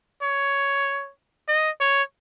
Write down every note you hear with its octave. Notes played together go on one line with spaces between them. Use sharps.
C#5
D#5
C#5